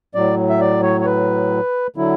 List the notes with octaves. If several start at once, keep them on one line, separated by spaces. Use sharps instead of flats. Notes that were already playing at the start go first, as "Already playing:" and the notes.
A2 F#3 D5
E5
D5
C#5
C#5
B4
D3 F#3 E4